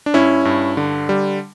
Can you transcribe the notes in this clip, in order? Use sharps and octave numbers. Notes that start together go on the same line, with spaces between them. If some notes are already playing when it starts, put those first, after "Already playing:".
D4
G2 C#4 E4
G2
D3
G3